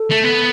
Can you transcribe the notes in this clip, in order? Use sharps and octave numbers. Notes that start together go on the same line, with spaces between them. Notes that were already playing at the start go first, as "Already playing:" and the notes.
Already playing: A4
A3
B3